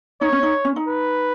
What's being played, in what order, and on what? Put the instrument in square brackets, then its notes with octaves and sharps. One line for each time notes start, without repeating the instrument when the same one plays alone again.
[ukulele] D#4 [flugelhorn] C#5
[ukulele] C#4
D#4
C#4
D#4
[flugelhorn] B4